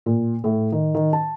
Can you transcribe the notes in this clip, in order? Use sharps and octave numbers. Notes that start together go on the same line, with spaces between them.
A#2
A2
D#3
D#3
A5